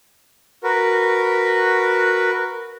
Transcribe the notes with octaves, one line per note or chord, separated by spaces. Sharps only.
F#4 A#4 B4